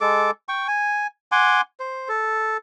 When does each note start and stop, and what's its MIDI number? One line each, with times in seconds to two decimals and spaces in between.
0.01 0.31 56
0.01 0.31 69
0.01 0.31 86
0.49 0.67 79
0.49 0.67 85
0.68 1.07 80
1.32 1.61 78
1.32 1.61 80
1.32 1.61 84
1.32 1.61 86
1.80 2.08 72
2.08 2.57 69